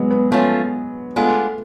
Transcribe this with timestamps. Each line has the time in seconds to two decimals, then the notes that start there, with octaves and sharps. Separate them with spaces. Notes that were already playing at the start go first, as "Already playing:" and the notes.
Already playing: F#3 G#3 B3
0.11 B3
0.31 F3 A3 B3 C#4 F4
1.16 G#3 A3 B3 D4 F4